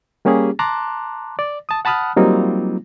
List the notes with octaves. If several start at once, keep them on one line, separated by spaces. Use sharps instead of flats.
G3 A#3 C#4 G4 G#4
A5 A#5 C6 D6 F#6
D5
A5 D#6
F#5 A5 B5 D#6 F6 F#6
F#3 G3 A#3 C4 D#4 F4